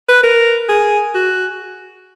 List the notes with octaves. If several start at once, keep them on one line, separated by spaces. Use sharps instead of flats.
B4
A#4
G#4
F#4